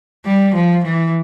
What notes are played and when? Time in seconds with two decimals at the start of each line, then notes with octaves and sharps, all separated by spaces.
0.25 G3
0.55 F3
0.84 E3